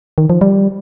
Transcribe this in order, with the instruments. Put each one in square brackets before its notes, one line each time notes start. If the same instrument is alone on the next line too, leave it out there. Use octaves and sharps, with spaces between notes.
[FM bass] D#3
F3
G3